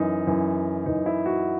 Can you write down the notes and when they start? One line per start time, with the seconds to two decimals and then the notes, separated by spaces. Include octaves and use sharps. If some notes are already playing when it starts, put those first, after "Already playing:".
Already playing: F#2 E3 D#4
0.27 F#2 E3
0.86 F#2 E3 D#4
1.06 E4
1.26 F#4